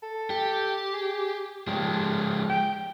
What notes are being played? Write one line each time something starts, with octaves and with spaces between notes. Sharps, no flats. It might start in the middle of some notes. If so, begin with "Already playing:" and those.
A4
G4
G#4
F3 G#3 G4
G5